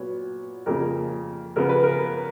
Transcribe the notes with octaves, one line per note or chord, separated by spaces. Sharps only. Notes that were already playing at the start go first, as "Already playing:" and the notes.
Already playing: A#2 F#3 B3 C#5
F2 C#3 F3 A#3 A#4
C#3 F3 B3 A#4
B4
A#4